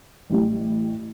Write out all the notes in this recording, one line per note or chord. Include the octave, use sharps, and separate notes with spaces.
A1 A2 G3